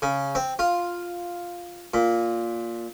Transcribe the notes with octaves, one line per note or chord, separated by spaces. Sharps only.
C#3
C4
F4
A#2